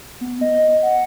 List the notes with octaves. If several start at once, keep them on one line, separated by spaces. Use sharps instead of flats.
B3
D#5
F#5